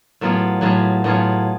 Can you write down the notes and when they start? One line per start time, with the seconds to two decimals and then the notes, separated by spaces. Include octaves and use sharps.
0.21 A2 F#3 B3 F4 G#4
0.61 A2 F#3 B3 F4 G#4
1.04 A2 F#3 B3 F4 G#4